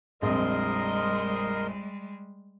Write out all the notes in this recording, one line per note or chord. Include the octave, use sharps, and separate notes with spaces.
A#1 F2 G3 G#3 A#4 D#5 C6